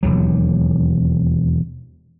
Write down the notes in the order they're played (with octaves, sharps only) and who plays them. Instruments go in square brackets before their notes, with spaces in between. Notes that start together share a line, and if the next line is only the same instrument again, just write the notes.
[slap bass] E1 D#2 F#3